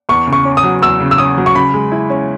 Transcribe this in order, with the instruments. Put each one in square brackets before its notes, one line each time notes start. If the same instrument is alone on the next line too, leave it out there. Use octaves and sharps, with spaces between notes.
[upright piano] E2 [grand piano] C#6
[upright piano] C#3
[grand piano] C#6
[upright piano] C#4
[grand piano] D#6
[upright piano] F#3
[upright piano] E2 [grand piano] E6
[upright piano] C#3
[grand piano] E6
[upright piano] C#4 [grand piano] D#6
[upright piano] F#3
[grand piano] C#6
[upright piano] C#3 [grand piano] B5
[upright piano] G#3
E4
C#4